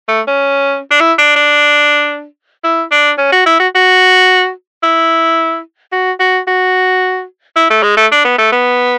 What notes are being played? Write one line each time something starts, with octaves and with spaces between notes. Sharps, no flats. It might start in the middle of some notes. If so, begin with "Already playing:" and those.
A3
C#4
D4
E4
D4
D4
E4
D4
C#4
F#4
E4
F#4
F#4
E4
F#4
F#4
F#4
E4
A3
G#3
A3
D4
B3
A3
B3